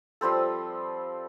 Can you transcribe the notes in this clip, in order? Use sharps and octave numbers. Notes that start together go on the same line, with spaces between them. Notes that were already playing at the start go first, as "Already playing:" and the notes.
F3 G3 C4 A4